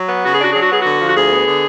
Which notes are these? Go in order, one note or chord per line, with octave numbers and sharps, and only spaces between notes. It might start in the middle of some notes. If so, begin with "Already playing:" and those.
Already playing: F#3
B3
C#3 F#4
G#4
D4 F#4
F#3 G#4
F#4
B3 G#4
F#4
D3
F3
F#4
D2 G#4
B3
D3